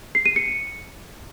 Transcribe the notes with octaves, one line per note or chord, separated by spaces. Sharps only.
C7
D#7
C#7